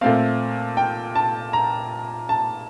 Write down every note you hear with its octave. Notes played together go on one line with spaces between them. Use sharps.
A#2 A3 C4 F5
G5
A5
A#5
A5